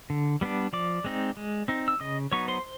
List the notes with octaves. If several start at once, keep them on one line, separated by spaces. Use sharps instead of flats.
D3
G3 B3 D4
F3 D5 D6
G#3 C4 D#4
G#3
C4 D#4
E6
C#3 D#5 D#6
F#3 B3 D#4 C#5 C#6
C5 C6